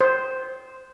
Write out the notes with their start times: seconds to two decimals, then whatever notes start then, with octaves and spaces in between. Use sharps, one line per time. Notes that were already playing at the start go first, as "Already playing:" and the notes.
0.01 C5